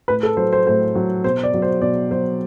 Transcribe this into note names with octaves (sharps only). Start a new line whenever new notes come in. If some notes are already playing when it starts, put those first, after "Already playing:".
A2 B4
A4
F#3 C5
C5
A2 C5
F#3
B2 C5
D5
F#3
C5
B2 D5
F#3 C5